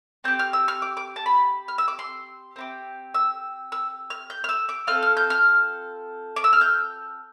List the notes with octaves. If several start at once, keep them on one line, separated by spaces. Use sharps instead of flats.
C4 G4 G6
F6
E6
F6
D6
D6
A5
B5
F6
E6
D6
C6
C4 E4 G4
E6
E6
F6
G6
F6
E6
D6
C4 F4 A4 F6
F6
G6
F6
D6
E6
F6
G6